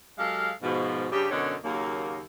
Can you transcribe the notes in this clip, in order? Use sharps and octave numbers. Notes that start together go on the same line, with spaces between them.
F#3 G#3 G4 A4 F5
G#2 B2 F3
G2 C#3 G3 G4
F#2 B2 D3 D#4 C#5 D5
D#2 C#3 F#3 A#3